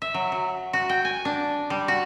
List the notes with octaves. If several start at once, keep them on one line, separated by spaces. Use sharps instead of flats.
E5
F#3
F#3
F#4
G5
G#5
D4
G3
F#4